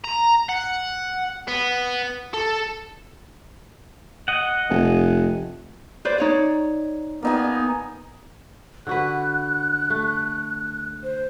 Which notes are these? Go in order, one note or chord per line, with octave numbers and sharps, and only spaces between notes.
A#5
F#5
B3
A4
D#5 F#5
F1
B4 C5 D5
D#4 C#5 D5
A#3 B3 D#4 G#5
D3 F#4 B4 F#6
A3
C5